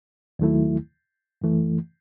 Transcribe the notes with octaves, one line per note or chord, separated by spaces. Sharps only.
D#2 D#3 F#3 A3 E4
F#2 E3 A3